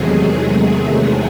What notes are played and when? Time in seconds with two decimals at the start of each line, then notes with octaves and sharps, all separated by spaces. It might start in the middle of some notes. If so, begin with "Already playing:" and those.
Already playing: E2 C3 D#3 F#3 G#3 A3 G#4
0.78 G#3 G#4